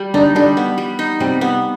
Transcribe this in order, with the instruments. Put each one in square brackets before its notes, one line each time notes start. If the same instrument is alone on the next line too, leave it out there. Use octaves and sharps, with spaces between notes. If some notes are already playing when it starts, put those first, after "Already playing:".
Already playing: [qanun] G3
[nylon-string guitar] D3 D4 [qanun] D#4
[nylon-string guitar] D3 D4 [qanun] G3
[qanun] B3
G3
D#4
[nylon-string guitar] C3 C4 [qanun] G3
[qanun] B3